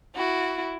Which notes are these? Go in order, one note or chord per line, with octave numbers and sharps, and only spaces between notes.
E4 F#4